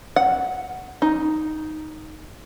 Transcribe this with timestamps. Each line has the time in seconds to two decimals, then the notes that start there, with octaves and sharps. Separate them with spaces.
0.16 F#5
1.02 D#4